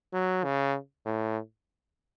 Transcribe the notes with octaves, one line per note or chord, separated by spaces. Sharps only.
F#3
C#3
A2